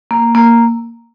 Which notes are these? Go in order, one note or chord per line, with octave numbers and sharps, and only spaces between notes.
A#3
A#3